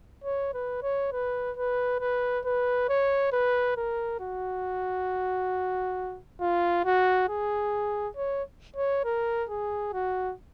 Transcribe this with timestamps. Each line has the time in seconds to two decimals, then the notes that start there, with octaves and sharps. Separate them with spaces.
0.24 C#5
0.54 B4
0.83 C#5
1.12 B4
1.57 B4
2.00 B4
2.45 B4
2.89 C#5
3.32 B4
3.77 A#4
4.20 F#4
6.41 F4
6.85 F#4
7.29 G#4
8.17 C#5
8.76 C#5
9.05 A#4
9.49 G#4
9.94 F#4